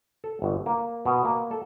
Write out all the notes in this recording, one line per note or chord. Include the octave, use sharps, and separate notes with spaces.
A4
G1
A#3
B2
A#3
A4